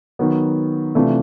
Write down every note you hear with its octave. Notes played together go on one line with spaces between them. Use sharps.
D#3 F#3 B3
C3 E3 A3 D4 F4